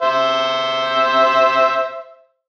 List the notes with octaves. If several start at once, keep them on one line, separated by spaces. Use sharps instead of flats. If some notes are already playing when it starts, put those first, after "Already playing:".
C5 E5